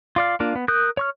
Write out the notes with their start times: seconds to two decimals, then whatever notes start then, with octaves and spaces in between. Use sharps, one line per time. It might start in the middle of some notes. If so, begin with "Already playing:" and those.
0.16 F4 D5 F5
0.40 A#3 D4 F4
0.55 B3
0.68 A#4 D#6 F#6 G6
0.97 C#5 C#6 F6